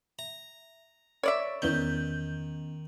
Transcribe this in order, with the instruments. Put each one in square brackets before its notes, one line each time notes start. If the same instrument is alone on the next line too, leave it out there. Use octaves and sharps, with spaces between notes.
[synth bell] E5 [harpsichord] A#5
[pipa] C#5 D5 E5 [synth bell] B5 A6 D7
[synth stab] E2 G6 [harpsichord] D#3 [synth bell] B3 C#4 D#5